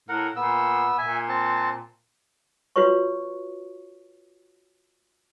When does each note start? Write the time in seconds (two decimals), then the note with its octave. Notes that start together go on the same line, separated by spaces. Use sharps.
0.09 A2 A#4 F#5
0.36 A#2 B3 E6
0.98 A#2 E5 G#5
1.29 C4 A5
2.76 F4 F#4 B4 C#5 C#6